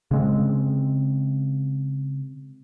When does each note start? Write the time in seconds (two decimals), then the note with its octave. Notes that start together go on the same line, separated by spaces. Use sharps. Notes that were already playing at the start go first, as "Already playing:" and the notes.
0.11 C#3 G#3 C4